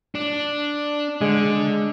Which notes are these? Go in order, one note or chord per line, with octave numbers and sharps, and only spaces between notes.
D4
D3 G#3